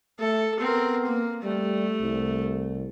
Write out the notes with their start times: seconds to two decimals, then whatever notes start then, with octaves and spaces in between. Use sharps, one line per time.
0.20 A3 A4
0.60 B3 C4 A#4
1.05 A#3
1.43 G3 A3
2.01 C2